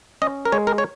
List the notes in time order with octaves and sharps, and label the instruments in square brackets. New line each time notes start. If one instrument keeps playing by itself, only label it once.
[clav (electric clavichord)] C#4 D#5
A#4
G#3 C#5
A#4
C#5